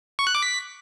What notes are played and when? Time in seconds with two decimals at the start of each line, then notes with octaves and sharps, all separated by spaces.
0.19 C#6
0.27 F#6
0.35 D6
0.42 B6